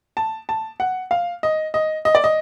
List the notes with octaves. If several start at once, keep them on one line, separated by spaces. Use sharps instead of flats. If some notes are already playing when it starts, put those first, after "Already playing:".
A5
A5
F#5
F5
D#5
D#5
D#5
D5
D#5